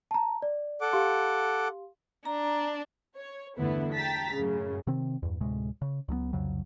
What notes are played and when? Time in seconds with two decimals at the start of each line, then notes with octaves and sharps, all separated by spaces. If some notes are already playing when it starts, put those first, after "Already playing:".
0.11 A5 A#5
0.42 D5
0.81 A4 F#5 D6
0.93 G4 F5 C6
2.25 D4 A#5
3.16 C#5
3.57 E2 G2 D3 A3 B3 E4
3.93 G5 A5 A#5 A6 B6
4.34 F#2 A2 C#3
4.87 C3 D#3 C4
5.23 E2 G2
5.40 D2 A2 C3 G#3
5.82 C#3
6.08 C#2 F#3 G3 B3
6.33 C2 F2 C#3 F#3